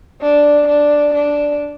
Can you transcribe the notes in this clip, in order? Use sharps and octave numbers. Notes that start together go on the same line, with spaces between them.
D4
D4
D4